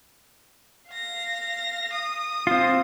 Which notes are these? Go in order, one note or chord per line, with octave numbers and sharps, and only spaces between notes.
F5 A#6
D#6
C4 F4